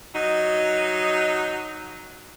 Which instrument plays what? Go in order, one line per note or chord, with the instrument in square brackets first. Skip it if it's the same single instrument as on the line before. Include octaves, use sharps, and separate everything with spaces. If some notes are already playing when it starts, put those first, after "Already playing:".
[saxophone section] F#3 D#4